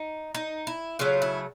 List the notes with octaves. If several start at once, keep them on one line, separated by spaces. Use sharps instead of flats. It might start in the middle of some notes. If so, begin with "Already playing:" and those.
Already playing: D#4
D#4
E4
C#3 F#3 A3 F4
E4